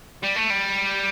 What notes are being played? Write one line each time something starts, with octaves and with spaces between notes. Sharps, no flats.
G3
A3
G3